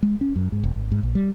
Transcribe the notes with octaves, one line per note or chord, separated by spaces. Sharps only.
G#3
C#4
F#2
G#2
E1
G#1
G#2
A#1
G3